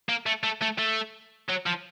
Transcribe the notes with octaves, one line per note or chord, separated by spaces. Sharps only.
A#3
A3
A3
A3
A3
F#3
F3